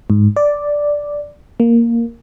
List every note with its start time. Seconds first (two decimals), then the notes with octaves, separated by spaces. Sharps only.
0.10 G#2
0.36 D5
1.60 A#3